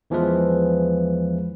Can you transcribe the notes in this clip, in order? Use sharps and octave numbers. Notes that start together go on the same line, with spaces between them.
E2 E3 F3 G#3 B4